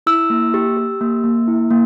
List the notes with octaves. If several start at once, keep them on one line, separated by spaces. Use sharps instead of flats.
E4 E6
A#3
G4
G4
A#3
A#3
E4
A#3